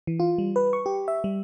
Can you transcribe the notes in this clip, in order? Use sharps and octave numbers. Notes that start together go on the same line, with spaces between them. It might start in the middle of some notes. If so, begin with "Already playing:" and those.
E3
F4
G3
B4
C#6
G4
E5
G3